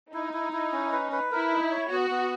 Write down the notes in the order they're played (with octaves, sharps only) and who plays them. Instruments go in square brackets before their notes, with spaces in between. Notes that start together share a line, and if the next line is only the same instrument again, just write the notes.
[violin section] D#4 [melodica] E4
[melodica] E4
E4
C#4
B4
B4
[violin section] E4 [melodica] A#4
[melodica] D#4
C#5
[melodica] B3 [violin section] F#4
[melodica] B3